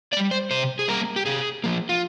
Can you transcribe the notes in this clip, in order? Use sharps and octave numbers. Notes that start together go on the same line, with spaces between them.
A#3 D5
G3
C5
C3 C5
G#4
G3 A#3 A#4
G4
C3 G#4
F3 A#3
F4